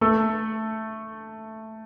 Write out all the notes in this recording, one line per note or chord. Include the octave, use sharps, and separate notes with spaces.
A3 A4